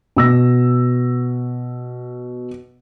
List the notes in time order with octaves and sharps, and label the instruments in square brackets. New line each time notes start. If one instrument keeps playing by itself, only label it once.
[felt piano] B2 E6 A#6